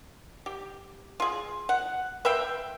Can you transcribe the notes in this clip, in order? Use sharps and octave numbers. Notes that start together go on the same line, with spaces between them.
G4
F4 G#4
F#5
B4 E5 F5 G5